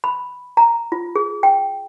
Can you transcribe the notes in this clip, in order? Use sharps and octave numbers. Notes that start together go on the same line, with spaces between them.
B5
A#5
F4
G#4
G5